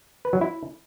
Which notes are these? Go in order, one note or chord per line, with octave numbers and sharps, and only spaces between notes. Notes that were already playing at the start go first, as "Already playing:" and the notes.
B4
F#3
E4